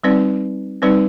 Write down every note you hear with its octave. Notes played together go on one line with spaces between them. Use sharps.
G3 C4 D#4 B4 D5
G3 C4 D#4 B4 D5